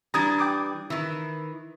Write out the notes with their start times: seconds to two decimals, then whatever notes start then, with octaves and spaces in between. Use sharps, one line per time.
0.14 E3 G3 D4 A#5 D#6 G#6
0.39 G5 D6 D#6
0.90 D#3 E3